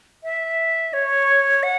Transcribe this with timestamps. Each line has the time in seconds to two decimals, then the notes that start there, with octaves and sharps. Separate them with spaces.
0.24 E5
0.93 C#5
1.63 F#5